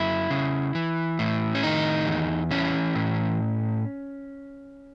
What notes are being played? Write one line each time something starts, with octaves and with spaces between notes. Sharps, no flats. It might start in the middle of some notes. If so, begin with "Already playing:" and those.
Already playing: F#2 E4
C#3
E3
A2
C#4
D#3 D#4
E2
E3 C#4
A2